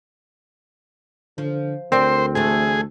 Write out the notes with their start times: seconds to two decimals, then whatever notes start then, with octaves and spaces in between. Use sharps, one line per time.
1.38 D3 F3
1.92 D2 C4 A#4 C5 D5
2.35 D3 E3 A3 G#4